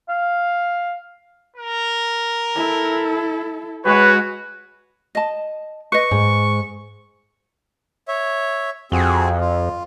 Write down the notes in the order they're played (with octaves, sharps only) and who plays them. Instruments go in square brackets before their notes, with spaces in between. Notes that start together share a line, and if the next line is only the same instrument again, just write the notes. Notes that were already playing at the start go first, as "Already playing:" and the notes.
[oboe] F5
[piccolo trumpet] A#4
[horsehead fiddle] E4 A4
[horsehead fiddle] G#3 [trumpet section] F#4 [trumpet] B4 [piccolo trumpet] C#5
[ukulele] D#5 A5
[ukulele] B4 D#5 [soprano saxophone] C#6
[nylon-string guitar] G#2
[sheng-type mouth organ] C#5 E5
[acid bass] F2 [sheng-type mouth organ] C4 F#4 G#4
[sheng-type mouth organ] F4